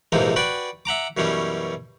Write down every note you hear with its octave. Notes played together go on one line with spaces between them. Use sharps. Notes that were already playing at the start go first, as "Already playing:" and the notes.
A#1 G#2 C3 E3 F3 D#4
F#4 B4 D5 G5 G#5
E5 F#5 A#5 D6
F#2 B2 E3 G3 C#4